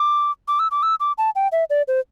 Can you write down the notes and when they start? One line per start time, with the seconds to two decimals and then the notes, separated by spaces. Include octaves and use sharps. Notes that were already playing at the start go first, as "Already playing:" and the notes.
Already playing: D6
0.48 D6
0.59 E6
0.71 D6
0.83 E6
1.00 D6
1.18 A5
1.35 G5
1.52 E5
1.70 D5
1.88 C5